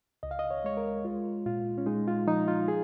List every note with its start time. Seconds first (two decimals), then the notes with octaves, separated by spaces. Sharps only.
0.23 C#2 D#5
0.31 F5
0.39 D#5
0.51 C#5
0.64 G#3 C#5
0.77 A#4
1.05 G#3 F4
1.46 A#2 F4
1.78 C#4
1.86 G#3 D#4
2.08 F4
2.27 F3 D#4
2.48 F4
2.68 G#4